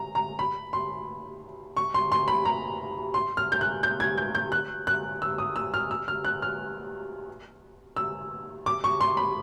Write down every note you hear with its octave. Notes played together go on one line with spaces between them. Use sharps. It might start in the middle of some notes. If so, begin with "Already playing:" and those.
Already playing: A#5
A#5
B5
C6
C#6
C6
C6
B5
A#5
C6
F6
G6
F#6
G6
G#6
G6
G6
F#6
F#6
E6
D#6
E6
F6
E6
F6
F#6
F6
E6
D6
C#6
C6
B5